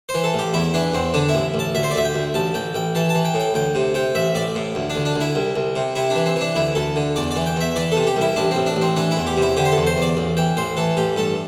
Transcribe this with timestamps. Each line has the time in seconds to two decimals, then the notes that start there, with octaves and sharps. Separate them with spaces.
0.09 C5
0.14 E3
0.24 A4
0.34 A1 G4
0.54 E2 E4
0.74 E3 D4
0.94 E2 C4
1.14 D3 D4
1.29 E4
1.35 A1
1.54 A1
1.59 A5
1.75 D2 E5
1.83 C5
1.91 D5
1.95 D2 E5
2.05 G5
2.14 D2
2.34 A1 A5
2.54 A1 G5
2.75 A1 G5
2.95 E3 A5
3.09 A5
3.15 E3
3.25 G5
3.34 A2
3.40 G5
3.54 D2 G5
3.75 C3
3.94 C3 G5
4.15 A1 E5
4.35 A1 D5
4.55 A2
4.75 D2
4.90 D4
4.95 D2
5.05 D4
5.16 D2 E4
5.35 C2
5.56 C2
5.76 C3
5.95 C3 E4
6.10 D4
6.15 E3
6.26 C4
6.36 E3 D4
6.55 D2 E4
6.75 D2 A4
6.96 D3
7.16 E2 D5
7.31 D5
7.36 E3
7.46 G5
7.56 E2 E5
7.76 E3 D5
7.92 C3 A4
8.07 G4
8.16 C2 E4
8.36 A1 D4
8.51 C4
8.56 A1
8.66 D4
8.76 A1
8.82 C4
8.96 E3 D4
9.11 E4
9.17 E2
9.27 G4
9.37 C3
9.42 E4
9.57 D3 G4
9.65 C5
9.72 A4
9.77 E2
9.87 C5
9.97 E2
10.02 D5
10.17 A1
10.37 E3 G5
10.57 A1 C5
10.77 E3 A4
10.97 A1 G4
11.16 G2 A4